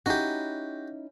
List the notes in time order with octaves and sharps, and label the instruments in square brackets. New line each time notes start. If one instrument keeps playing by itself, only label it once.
[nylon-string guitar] C#4 D#4 E4 [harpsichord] F#4 G4